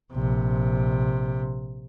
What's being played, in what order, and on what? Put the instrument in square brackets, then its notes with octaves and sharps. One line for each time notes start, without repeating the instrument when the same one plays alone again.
[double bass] A#1 C3